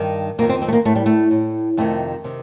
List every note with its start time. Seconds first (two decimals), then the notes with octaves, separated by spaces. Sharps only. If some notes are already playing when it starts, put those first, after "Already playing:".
Already playing: G2 D#3
0.39 F2 A#3
0.42 D#3
0.49 C4
0.62 C4
0.68 A3
0.73 A#3
0.85 A2 A3
0.96 G3
1.06 A3
1.31 A2
1.77 F2 C3 D#3 A3
2.24 C3 D#3